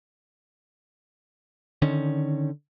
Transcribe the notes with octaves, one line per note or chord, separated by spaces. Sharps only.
D3 D#3 C#4